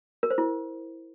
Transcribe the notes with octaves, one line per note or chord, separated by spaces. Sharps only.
A#4
C5
E4